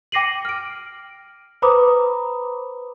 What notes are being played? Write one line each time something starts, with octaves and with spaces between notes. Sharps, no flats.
G5 D6 A#6 C7 D#7 F#7
F6 D7
B4 C5 A#5 B5 D6 D#6